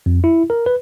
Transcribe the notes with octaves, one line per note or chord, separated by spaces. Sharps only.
F2
E4
A#4
B4